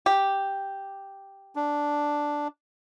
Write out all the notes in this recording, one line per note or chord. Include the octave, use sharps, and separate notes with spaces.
G4
D4